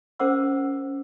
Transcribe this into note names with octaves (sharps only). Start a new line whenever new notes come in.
C#4 A#4 C5 F#5 D6 E6